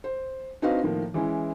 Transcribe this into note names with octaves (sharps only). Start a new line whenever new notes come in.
C5
C4 D4 D#4 F#4 B4 F5
A2 D#3 F3 A#3
E3 G#3 C#4 E4